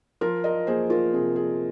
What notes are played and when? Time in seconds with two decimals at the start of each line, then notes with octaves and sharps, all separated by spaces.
0.21 F3 F4 A#4
0.44 A#4 D#5
0.67 A#3 G#4 C5
0.90 F4 A#4
1.13 C3 G#4
1.36 G#4